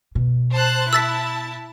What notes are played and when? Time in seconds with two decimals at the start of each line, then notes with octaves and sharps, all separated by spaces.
0.15 B2
0.53 C5 A5 F#6
0.93 E4 A5 E6 A6 B6